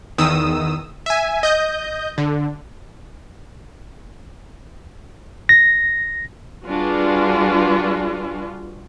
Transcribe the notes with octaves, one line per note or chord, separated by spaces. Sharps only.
E2 D#3 D#6 E6
E5 G#5
D#5 G6
D3
A#6
G3 D4 F4 F#4 G#4 B4